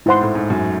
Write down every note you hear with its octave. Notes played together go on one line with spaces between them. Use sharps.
G#2 E4 C5 F#5 C6
A2
G#2
F#2